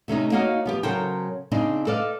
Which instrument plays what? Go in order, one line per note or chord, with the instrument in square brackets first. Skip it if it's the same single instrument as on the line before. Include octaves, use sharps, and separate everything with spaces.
[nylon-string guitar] C3 A3 C#4 D#4
A#3 D#4 F#4 C#5 D#5 F5
F3 B3 G4
C#3 F#3 A4 A#4 C5 G5
C#3 C4 D4 D#4
A4 B4 D5 D#5 F5